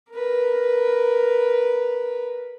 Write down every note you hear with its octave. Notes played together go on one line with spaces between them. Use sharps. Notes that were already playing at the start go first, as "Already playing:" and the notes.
A#4 B4